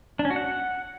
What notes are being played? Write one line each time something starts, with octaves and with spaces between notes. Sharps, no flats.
D4
C#4
F#4
F#5